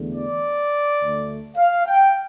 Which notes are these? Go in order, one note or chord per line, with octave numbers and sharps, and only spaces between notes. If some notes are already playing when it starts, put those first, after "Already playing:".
Already playing: E2 D3 A3
D5
D2 D3 A3
F5
G5